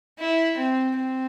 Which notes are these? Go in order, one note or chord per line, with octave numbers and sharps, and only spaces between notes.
E4
C4
C4